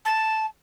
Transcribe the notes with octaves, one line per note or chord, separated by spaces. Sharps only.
A5